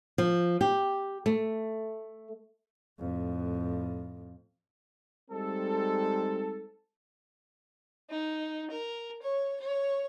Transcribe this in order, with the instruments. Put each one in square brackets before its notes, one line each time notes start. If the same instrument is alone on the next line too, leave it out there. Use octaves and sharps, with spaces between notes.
[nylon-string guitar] F3
G4
A3
[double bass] F2 A2
[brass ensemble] G3 G#3 C4 D#4 A4
[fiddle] D#4
A#4
C#5
C#5